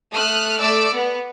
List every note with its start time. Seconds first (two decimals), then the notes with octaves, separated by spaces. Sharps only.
0.12 A3 D#6 F6 F#6
0.59 A3 D5 D6 E6
0.92 B3